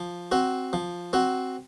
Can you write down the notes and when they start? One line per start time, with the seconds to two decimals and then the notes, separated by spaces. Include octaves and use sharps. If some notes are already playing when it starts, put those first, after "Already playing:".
Already playing: F3
0.31 C4 F#4
0.73 F3
1.13 C4 F#4